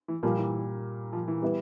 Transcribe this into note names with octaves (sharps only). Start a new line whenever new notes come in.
E3
A#2 F3 G3 A#3
E3
F3
E3
G3 B3 E4